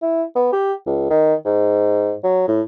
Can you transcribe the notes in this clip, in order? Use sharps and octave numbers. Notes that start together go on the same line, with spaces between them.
E4
B3
G4
C#2
D#3
G#2
F#3
A2